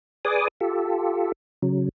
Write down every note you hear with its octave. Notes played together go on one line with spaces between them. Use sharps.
G#4 B4 D5 G#5 D6 D#6
F4 G4 A4
C#3 F#3